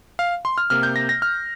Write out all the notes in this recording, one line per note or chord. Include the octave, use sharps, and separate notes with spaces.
F5
C6
F6
C3 A#3 F6
G6
A#6
A#6
F6